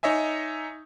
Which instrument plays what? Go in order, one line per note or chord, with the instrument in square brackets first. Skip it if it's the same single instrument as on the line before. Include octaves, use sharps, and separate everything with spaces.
[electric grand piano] D#4 C#5 D#5 E5 G#5